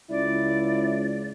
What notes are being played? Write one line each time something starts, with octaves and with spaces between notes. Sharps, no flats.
C#2 E4 D5